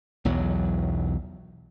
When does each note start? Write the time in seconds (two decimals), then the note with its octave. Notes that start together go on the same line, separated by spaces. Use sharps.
0.25 B1 E2 F#3